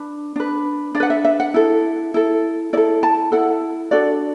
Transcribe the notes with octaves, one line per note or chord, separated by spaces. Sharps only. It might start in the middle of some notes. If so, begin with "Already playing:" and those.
Already playing: D4 B4
D4 B4
D4 D5
B4 F#5
E5
E5
F#5
E4 A4
E4 A4
E4 A4 D5
A5
E4 A4 F#5
D4 F#4 A4 D5